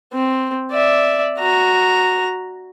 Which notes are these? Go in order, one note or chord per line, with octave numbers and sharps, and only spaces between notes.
C4
D5 E5
F#4 A#5